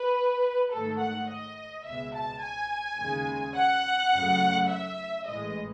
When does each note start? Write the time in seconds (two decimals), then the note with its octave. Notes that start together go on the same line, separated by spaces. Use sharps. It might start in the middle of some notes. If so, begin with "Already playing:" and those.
Already playing: B4
0.72 G#2 D#3 A3 A4
1.00 F#5
1.30 D#5
1.86 C#2 B2 G#3 E5
2.15 A5
2.42 G#5
2.99 D#2 C#3 G#3
3.56 F#5
4.14 F#2 C#3 F#3 A3
4.69 E5
5.27 A1 A2 E3 G#3 D#5